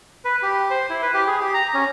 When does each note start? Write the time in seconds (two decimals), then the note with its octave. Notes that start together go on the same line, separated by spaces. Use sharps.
0.25 B4
0.42 G4
0.70 C5
0.90 E4
1.02 B4
1.14 G4
1.27 G#4
1.41 G4
1.54 A#5
1.74 C#4